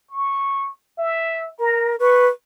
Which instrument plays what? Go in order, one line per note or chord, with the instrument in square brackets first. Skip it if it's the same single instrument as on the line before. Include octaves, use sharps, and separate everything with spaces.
[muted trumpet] C#6
E5
[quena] A#4 [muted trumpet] A#5
[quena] B4 [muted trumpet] C#6